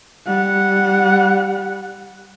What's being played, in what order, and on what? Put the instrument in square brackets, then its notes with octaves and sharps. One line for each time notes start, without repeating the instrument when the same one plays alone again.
[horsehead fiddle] G3 F#5